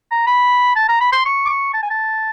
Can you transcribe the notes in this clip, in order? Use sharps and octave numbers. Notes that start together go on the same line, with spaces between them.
A#5
B5
A5
A#5
B5
C6
C#6
D6
C#6
A5
G#5
A5